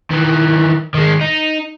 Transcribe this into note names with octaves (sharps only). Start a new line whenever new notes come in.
D#3 E3
D#3 G#3
D#4